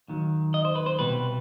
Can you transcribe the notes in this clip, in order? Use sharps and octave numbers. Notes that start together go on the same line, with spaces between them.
D#2 D#3 F#3
D#5
C5
B4
C5
C2 B2 G3 B4